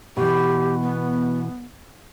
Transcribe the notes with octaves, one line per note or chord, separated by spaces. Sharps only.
B2 E3 G4
B3